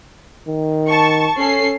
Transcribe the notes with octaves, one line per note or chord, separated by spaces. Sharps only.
D#3
A5 C#6
C#4 A4 C7